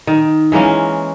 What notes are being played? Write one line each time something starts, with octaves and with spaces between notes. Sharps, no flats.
D#3
E3 G#3 A#3 C#4